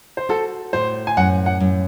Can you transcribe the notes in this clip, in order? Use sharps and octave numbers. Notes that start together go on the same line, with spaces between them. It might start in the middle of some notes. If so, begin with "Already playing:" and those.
C5
F#4 A4
A2 C5
G#5
F#2 F#5
F#5
F#2